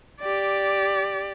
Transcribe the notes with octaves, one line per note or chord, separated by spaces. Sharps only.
G4 D5